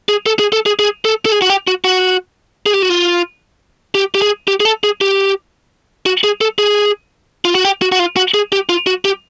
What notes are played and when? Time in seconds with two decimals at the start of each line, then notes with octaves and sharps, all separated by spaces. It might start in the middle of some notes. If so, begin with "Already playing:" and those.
0.09 G#4
0.26 A4
0.39 G#4
0.53 A4
0.66 G#4
0.79 G#4
1.05 A4
1.25 A4
1.32 G#4
1.42 F#4
1.50 G4
1.67 F#4
1.84 F#4
2.66 G#4
2.73 G4
2.82 F#4
2.90 F4
3.95 G4
4.15 G4
4.22 G#4
4.48 G4
4.60 G#4
4.65 A4
4.84 G#4
5.01 G4
6.06 F#4
6.24 G#4
6.41 A4
6.59 G#4
7.45 F4
7.55 F#4
7.65 G4
7.82 F#4
7.92 F#4
7.99 F4
8.17 F#4
8.34 G#4
8.52 G4
8.69 F4
8.87 F#4
9.05 G4